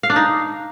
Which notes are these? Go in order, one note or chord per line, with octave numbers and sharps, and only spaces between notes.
F5
D4
D#4